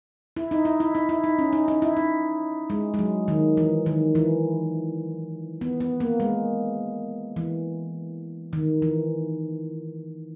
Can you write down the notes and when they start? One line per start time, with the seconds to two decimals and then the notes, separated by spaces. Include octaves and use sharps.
0.37 E4
0.51 D#4
0.65 E4
0.80 E4
0.95 D#4
1.09 E4
1.24 D#4
1.38 C#4
1.53 D#4
1.68 D#4
1.82 E4
1.97 D#4
2.70 G#3
2.94 G#3
2.99 F#3
3.28 D#3
3.57 E3
3.86 D#3
4.15 E3
5.61 B3
5.80 B3
6.00 A#3
6.20 G#3
7.36 E3
8.53 D#3
8.82 E3